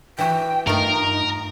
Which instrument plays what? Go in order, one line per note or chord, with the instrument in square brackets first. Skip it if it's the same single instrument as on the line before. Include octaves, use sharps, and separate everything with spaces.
[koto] E3 E4 F#4 [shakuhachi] G5
[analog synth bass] G2 [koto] A3 F4 [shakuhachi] D#4 [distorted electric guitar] A#4